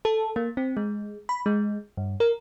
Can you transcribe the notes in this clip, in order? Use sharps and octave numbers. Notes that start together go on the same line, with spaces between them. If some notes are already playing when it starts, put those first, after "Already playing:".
A4
A#3
C4
G#3
B5
G#3
G2
A#4